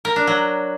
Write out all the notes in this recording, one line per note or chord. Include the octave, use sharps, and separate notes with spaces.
A#4
D4
F#3